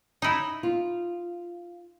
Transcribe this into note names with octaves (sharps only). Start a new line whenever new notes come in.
D#4 E4
F4